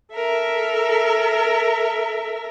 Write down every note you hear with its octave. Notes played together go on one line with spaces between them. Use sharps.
A4 A#4 E5